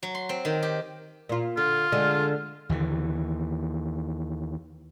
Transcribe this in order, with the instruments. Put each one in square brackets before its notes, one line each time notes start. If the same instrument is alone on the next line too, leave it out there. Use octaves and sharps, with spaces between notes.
[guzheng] F#3
C6
C4
D#3
G4
[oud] A#2 F4
[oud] D3 [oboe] F4
[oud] D3 G#3
[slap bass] D#2 D3 E3